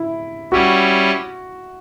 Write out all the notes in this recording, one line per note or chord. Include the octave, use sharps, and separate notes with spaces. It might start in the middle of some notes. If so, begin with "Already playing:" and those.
Already playing: E4
G3 C#4 E4 F#4